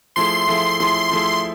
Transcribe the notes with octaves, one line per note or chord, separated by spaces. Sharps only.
F3 A3 E4 G#4 C6
F3 A3 E4 G#4
F3 A3 E4 G#4 C6
F3 A3 E4 G#4